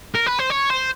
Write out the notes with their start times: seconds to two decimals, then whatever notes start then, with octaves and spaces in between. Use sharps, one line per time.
0.15 A#4
0.26 B4
0.39 C5
0.50 C#5
0.70 C5